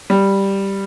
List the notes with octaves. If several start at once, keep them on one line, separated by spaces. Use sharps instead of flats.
G3